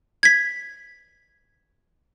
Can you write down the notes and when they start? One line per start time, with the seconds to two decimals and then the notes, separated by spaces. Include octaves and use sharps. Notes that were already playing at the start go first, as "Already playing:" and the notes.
0.23 G#6 B6